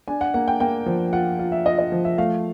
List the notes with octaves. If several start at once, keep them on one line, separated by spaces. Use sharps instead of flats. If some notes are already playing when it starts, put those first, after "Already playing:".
D4 G#5
F#5
A#3 F#5
G5
A#3 G5
F3
F4 F#5
F4
E5
F4 D#5
D#5
F3
E5
A3 F5